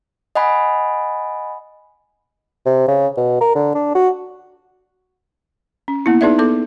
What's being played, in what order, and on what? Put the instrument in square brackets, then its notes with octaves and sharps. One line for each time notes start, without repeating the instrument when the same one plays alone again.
[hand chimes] D#5 F#5 G#5 B5
[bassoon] C3
C#3
B2
A#4
D3
D4
F#4
[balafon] C#4
A#3 B3 E4
B3 D#4 G#4 B4 D5 E5
B3 A4 D6